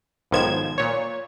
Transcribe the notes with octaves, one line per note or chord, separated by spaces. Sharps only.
B1 G#2 D#3 F3 G#6 E7
A#2 C#5